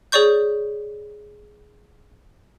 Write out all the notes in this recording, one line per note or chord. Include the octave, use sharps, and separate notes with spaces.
G#4 C#5 D5 C#6 G6